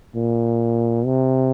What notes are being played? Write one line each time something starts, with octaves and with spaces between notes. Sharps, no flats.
A#2
C3